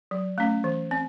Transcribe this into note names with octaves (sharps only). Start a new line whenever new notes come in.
F#3
A3 C#4
E3
C4